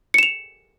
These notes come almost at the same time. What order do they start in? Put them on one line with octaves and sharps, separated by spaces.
C#7 E7 F7